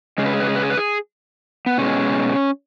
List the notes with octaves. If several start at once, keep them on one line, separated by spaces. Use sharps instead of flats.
C#3 G#3 G#4
B4
G#4
B4
G#4
B4
G#4
B4
G#4
B3
B2 G#3 C#4